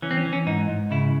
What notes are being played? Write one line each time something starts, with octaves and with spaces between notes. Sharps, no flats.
E3 C#4
C4
C#4
E3
C#4
G#2 D#4
G#2
C#3 E4